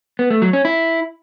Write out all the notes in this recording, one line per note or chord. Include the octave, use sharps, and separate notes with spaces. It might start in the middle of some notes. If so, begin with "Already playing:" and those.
B3
A3
F#3
C#4
E4